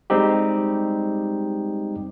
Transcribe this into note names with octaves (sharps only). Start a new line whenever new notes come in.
G3 G#3 C4 D#4 G4